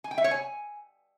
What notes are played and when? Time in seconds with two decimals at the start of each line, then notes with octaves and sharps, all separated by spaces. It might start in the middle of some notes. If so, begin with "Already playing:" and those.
0.04 G#5
0.11 G5
0.18 E5
0.24 C#5
0.31 G#5